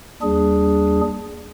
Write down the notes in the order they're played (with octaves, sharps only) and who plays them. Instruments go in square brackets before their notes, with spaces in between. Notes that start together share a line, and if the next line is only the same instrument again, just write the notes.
[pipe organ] D#2 G3 D4 G#4